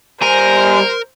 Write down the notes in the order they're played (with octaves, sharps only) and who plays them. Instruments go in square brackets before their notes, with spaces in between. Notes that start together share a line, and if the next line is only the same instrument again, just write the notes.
[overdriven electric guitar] G3 G#5 [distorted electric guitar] A#4 [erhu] C5